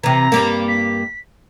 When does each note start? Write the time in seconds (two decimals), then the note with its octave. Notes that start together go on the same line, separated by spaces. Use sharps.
0.04 C3 E3 A#5
0.32 G2 G3 A#3
0.68 B6